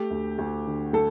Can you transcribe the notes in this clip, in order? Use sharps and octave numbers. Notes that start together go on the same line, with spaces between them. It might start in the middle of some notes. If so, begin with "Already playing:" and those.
Already playing: A3 G4
D2
D2
D3
A3 A4